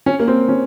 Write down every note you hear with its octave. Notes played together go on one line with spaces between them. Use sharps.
C#4
A#3
C4
C#4